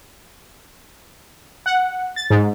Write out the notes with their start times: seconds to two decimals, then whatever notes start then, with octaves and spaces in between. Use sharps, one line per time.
1.66 F#5
2.16 A6
2.30 G#2